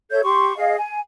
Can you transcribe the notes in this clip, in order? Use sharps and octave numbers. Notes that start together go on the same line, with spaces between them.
A4 C#5 E5 G6
G4 C6 C#6
G#4 D#5 F5
G#5